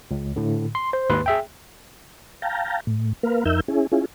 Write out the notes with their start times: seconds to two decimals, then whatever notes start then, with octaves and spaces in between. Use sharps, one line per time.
0.11 C#2
0.36 A2 D3
0.75 C6
0.93 C5
1.10 D#2 G#2 B4 C6
1.26 G#4 E5 G5
2.42 F5 G5 A5 A#5
2.87 A2
3.23 A#3 A#4 B4 F5
3.45 F2 D#4 A#4 E5 E6 G6
3.68 C#4 E4 G#4
3.92 C#4 E4 F4 G#4